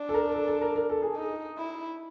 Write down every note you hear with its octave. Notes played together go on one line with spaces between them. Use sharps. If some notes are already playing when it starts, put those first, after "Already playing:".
Already playing: D4
A4
A#4
A4
A4
A#4
A#4
A4
G#4
D#4
E4